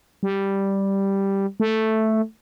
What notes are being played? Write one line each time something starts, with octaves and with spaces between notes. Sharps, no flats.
G3
A3